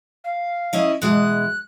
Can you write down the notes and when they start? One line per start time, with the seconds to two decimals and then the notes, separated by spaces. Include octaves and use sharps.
0.24 F5
0.73 C#4 E4 D#5
1.02 B2 E3 G#3 F#6